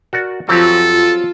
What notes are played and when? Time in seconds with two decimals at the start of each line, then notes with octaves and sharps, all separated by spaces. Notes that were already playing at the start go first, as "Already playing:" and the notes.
0.13 F#4 A#4 D5
0.49 F3 F#3 C4 G4 A4
0.91 F4